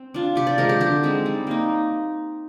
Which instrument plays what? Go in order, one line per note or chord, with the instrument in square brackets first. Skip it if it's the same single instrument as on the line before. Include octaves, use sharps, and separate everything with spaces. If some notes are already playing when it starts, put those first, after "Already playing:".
Already playing: [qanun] C4
D4 F4
C3 G4
D5
F3 G#3 C4 A#4
G4
D3 G4
G#3 C4 D#4
G3
A#3 D#4